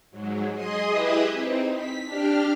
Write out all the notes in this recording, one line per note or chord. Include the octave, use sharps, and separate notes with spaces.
G#2 F#3
G#4 D#5 C6 D#6
E4 G4 G#4 B4 D#5 E5
C4 D#4
B6
D4 G4 F6